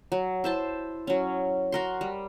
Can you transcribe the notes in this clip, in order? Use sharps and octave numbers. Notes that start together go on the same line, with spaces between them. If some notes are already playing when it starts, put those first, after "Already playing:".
F#3
E4 C5 A5
F#3 C#4
F#4 A#4 C6
G3